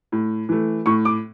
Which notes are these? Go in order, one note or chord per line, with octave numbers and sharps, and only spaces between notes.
A2
E3 A3
A2 C#6
D6